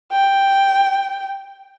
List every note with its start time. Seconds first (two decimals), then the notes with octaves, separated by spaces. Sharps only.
0.12 G5